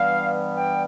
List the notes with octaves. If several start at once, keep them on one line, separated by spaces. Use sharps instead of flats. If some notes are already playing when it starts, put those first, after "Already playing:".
Already playing: G2 E3 G3 B3 F5
G5